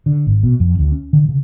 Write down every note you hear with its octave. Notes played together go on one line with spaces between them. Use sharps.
D3
G#1
B2
F2
D2
C#4
D3
C#3